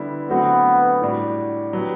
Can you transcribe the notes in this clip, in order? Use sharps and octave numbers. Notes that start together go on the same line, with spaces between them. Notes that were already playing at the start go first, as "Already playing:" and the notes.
Already playing: D3 G3 B3 E4
D3 F#3 A3 B3 C4 F#4
A2 G3 D4 F#4
F#3 B3 D4 G4